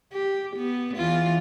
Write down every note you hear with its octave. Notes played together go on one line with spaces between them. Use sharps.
G4
B3
E2 E3 F4